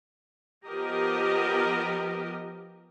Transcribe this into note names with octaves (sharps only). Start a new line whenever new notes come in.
F3 B3 G4 A#4 D#5